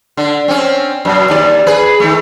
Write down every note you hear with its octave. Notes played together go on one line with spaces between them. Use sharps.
D3
C4 C#4
F#2 B2
D#2 D5
G#4 B4
D#3 A3